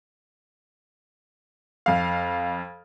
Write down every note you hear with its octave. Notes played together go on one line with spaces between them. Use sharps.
F2 F5